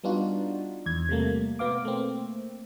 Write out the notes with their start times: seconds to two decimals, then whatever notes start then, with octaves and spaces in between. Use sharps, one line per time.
0.04 G3 B3 D4 D#4 F4 F#4
0.86 E2 G#6
1.09 C3 G3 A3 A#3
1.59 B2 B3 F5 D6
1.85 A3 A#3 C4